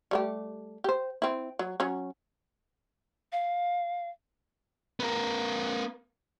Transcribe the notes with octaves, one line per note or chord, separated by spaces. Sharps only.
G3 A3 G4
G4 C5
C4 E4
F#3
F#3 C#4
F5
B3 A#4